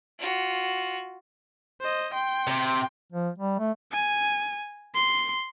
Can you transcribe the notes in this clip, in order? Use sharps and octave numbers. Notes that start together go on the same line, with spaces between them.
F4 F#4
C5 D#5
G5 C6
C3
F3
G3
A3
G#5
C6